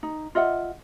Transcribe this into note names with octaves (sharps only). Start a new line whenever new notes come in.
D#4
F4 D#5 E5 F#5